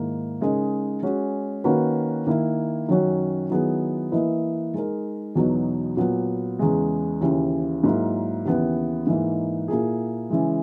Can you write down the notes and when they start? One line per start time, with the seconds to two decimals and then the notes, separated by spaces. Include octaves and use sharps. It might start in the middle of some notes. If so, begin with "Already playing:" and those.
Already playing: G#2 D#3 A#3 E4
0.41 C#3 G#3 D#4 A#4 D#5
1.03 G#3 C#4 F#4
1.64 D#3 A#3 C#4 F#4 B4
2.27 D#3 A#3 E4
2.89 F#2 D#3 F#3 C#4 F#4
3.50 D#3 F#3 B3 E4 G#4
4.12 E3 A#3 E4 B4 D#5
4.74 G#3 D#4 A#4
5.36 E2 B2 F#3 B3 D#4
5.97 A#2 F#3 B3
6.59 E2 C#3 G#3
7.21 D#2 C#3 E3
7.83 G#2 F#3 A#3 E4 A#4
8.45 D#2 C#3 E3 B3
9.07 G#2 E3 A#3 D#4
9.68 A#2 A#3 E4 G#4
10.30 C#3 E3 G#3